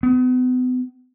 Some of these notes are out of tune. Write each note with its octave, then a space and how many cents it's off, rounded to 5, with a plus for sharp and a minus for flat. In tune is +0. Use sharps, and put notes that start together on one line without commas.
B3 +40